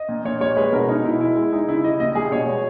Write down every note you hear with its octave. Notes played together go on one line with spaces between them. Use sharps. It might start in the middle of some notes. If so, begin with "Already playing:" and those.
Already playing: D#5
A#2
A#2 C#5
G3 C#5
G#3 B4
B2 A#4
B2 D#4
B2 E4
G#3 E4
G#3
G#3 D#4
C#3 E4
G3 D#5
A#2 D#5
G3 G#4
B2 C#5
G#3